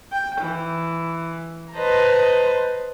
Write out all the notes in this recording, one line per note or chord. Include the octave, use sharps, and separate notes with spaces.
G5
E3
B4 C5 D#5 A5 A#5